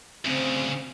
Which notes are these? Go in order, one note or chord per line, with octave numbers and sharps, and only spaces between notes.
D2 C#3 C4